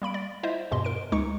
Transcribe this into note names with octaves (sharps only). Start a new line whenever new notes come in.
G3 A#3 B5 D7
D5
E4 F4 C5 D#5 E5
E2 G2 B2 D#5 C6
A#4 D7
C#2 G#3 D#4 C#6 C#7